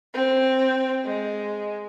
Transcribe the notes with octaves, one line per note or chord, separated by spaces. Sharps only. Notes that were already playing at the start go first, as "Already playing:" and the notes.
C4
G#3